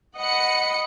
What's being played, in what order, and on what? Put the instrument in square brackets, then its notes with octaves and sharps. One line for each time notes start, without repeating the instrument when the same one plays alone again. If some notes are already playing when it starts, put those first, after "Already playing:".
[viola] D#5 B5 [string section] F#5 C#7